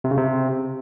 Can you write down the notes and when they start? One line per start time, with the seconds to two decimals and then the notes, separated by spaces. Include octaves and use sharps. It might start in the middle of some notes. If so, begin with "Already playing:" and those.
0.04 C3
0.11 C#3
0.17 C3